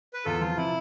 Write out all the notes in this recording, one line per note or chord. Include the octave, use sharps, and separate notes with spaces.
B4
E2 F4 A4
F3 F4
C3 E4